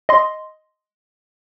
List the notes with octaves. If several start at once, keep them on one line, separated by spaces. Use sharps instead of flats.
D#5 C6